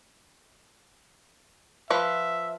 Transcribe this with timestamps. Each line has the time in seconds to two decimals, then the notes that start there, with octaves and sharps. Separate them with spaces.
1.90 F3 F4 B4 E5